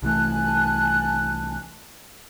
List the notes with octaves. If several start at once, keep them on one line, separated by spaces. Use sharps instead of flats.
C2 E3 A3 G#5 A5 F#6